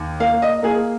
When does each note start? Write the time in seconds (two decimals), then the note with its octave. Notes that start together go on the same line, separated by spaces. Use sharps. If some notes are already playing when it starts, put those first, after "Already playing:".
Already playing: D#2
0.20 A#3 F5
0.42 D#5
0.63 A#3 G#4